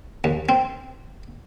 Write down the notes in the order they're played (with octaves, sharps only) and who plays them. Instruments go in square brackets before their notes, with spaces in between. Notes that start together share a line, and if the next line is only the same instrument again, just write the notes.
[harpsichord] D#2
C4